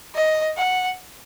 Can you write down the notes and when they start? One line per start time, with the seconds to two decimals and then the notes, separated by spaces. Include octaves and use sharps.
0.15 D#5
0.57 F#5